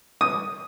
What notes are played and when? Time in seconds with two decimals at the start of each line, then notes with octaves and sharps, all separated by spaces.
0.21 D#6